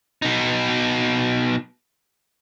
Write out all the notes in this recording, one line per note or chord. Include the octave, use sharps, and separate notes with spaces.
B2 D#4